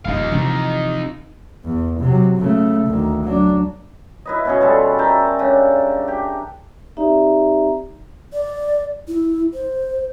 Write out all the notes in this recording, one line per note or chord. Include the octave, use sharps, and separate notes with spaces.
D#1 F2 D#4 F5
C3 E3 F3
E2
C3 F#3
C#3 A3
D2 D#3
F#3 D4
E4 B4 D#5
B2 C#4 G#4
G3 F4 A4
A#4 E5 G5 A5
C#3 D4
G4
C4 D#4 G4 D5 E5 A#5
D5
E4
C5